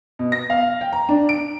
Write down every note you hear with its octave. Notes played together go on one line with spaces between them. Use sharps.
B2
A#6
F5
G5
A#5
D4
D7